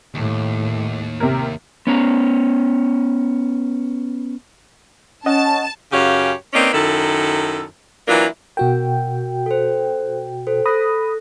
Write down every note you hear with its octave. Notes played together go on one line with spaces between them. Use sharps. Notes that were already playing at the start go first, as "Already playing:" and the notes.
D#2 A2
C3 A#4
B3 C#4 A#5
C#4 D#5 F#5 A5
F#2 C#3 F#4 G4 C#5 F5
A#3 C4 C#4 D#4 B4 D5
F#2 D#3 E4 A4
E3 F#3 A#3 D4 E4 F4
B2 F#4 A#4 G5
A4 C5
A4 C5
A4 B5 D#6 F#6 A#6